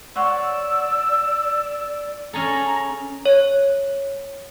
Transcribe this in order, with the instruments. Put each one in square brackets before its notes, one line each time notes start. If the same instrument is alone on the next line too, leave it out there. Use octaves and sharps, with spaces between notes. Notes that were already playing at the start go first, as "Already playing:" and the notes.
[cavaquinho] C#5 F#5 C6 [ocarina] D5 [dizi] E6
[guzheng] C#4 G#4 A4 [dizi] A#5
[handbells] C#5